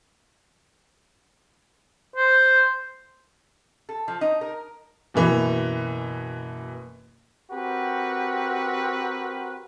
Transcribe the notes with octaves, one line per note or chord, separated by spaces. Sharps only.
C5
A4
F3
D#4
A#4
F#1 B2 E3
C4 F#4 G4 A#4 B4